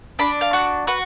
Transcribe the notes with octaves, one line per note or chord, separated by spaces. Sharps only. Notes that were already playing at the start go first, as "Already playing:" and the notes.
D4 B5
F5
F#4 F#5
F#4 B4